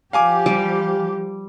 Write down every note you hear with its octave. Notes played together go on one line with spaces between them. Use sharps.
F3 G4 F5 G#5 D6
G3